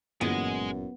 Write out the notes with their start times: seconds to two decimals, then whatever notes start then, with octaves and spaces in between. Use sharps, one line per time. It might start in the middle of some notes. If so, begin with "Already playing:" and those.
0.21 G1 F#2 A#2 E3 G#3 B3 D#5